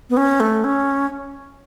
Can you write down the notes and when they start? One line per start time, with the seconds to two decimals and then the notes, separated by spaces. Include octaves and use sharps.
0.10 B3
0.17 C#4
0.40 A3
0.64 C#4